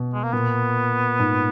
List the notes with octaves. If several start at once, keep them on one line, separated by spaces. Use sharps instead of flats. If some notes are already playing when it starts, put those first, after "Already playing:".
Already playing: B2
G#3
A#3
A#2 B3
G#2